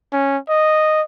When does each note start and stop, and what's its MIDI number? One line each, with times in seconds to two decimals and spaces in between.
0.13 0.38 61
0.49 1.02 75